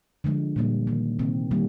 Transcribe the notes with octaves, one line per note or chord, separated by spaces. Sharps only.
D3 F3 G#3
A#2 G3 A#3
D#3 A#3
C3 D#3 A#3 C4
D#3 G3 A#3